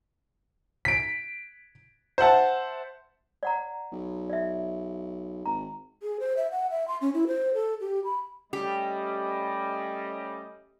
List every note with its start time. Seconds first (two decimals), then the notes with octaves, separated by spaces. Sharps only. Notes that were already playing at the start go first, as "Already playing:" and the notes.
0.85 B6 D7
2.18 C5 E5 F#5 A5
3.43 D5 F#5 A#5
3.92 B1
4.30 D5 E5
5.46 G#1 A#5
6.03 G#4
6.20 C5
6.37 E5
6.51 F#5
6.70 E5
6.88 C6
7.01 C#4
7.14 E4
7.27 C5
7.54 A4
7.80 G4
8.04 B5
8.53 G3 A3 C#4 G4 D#5